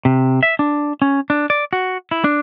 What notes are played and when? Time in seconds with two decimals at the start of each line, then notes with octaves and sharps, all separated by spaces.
0.05 C3
0.43 E5
0.59 D4
1.02 C#4
1.30 D4
1.50 D5
1.73 F#4
2.11 E4
2.24 D4